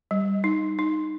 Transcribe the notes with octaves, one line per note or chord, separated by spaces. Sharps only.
G3
D#4
D#4